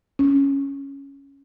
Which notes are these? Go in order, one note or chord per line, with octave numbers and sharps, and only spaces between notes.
C#4